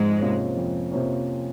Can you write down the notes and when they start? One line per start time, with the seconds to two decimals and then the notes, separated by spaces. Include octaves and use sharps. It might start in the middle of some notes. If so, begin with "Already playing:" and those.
Already playing: F2 G#2 G#3
0.19 C3 F3 A#3 C#4
0.57 F2
0.92 C3 F3 A#3 C#4